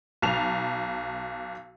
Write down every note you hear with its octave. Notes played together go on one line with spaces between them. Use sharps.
B1 A5 F7